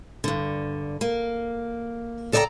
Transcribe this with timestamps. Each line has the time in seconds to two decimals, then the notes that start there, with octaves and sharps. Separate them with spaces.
0.24 G2 D3
1.01 A#3
2.32 C#3 A4 D5 D#5 G5 A#5